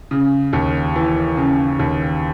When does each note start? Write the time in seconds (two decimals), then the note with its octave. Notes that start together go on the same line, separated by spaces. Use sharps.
0.11 C#3
0.53 D#2
0.95 E3
1.37 C#3
1.79 D#2